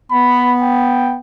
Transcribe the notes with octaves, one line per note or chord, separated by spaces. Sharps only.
B3 B5
G5